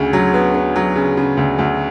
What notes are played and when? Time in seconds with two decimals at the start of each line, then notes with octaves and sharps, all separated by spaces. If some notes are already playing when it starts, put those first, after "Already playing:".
Already playing: D2 C#3
0.13 F#3
0.34 B3
0.54 B3
0.76 F#3
0.95 C#3
1.17 C#3
1.37 D2
1.59 D2